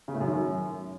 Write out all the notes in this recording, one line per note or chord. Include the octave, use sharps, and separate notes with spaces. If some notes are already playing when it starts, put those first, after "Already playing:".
C#3
A2
F#2
D#3
F#2